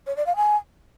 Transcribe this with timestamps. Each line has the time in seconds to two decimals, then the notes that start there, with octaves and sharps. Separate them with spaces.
0.07 C#5
0.17 D5
0.26 F5
0.36 G#5